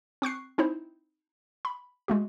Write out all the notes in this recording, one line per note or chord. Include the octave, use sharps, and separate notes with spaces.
C4 C#6 F#6 C7
C4 D#4 E4 C5
B5
G#3 A3 F#4